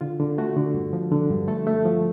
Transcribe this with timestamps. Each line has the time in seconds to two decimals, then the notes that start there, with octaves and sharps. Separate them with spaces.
0.01 D3 F4
0.20 D3
0.38 A3 F#4
0.57 D3
0.74 G2
0.93 F3
1.12 D3
1.30 G2
1.48 A3 A4
1.67 A3
1.85 F3